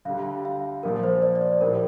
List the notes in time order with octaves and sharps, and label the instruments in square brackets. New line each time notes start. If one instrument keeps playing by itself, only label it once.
[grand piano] D2 D3 G3 [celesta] F5
[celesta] F5
[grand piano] A#1 A#2 F3 [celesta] A#4
[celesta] C5
D5
D5
C5
[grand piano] A#1 A2 G3 [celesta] A#4